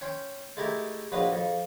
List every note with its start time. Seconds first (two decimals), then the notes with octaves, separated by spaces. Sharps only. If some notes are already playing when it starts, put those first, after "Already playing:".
0.01 C#4 G5 C6
0.57 G#3 A3 E4 G4 A#4
1.12 A#1 F#3 B4 D#5 F5 C6
1.32 F2